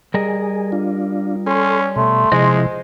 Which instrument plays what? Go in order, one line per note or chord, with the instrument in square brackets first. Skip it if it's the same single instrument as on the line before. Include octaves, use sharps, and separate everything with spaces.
[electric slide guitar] G3 A#4 D#5 [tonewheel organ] G#4
[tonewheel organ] D4 F4
[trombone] C#4 [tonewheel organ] A4 C6
[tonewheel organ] B2 [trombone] A3 [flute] C6
[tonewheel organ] C3 F3 E4 [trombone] G#3 [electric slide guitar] C5 D#5